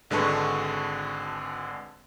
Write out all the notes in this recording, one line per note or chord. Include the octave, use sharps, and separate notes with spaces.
G#1 D3 G#3 B4 A5 C#6